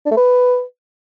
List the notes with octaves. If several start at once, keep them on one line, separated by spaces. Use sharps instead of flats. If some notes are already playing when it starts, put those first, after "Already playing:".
D4
A3
B4